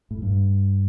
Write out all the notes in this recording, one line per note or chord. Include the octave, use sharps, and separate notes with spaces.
A2
G2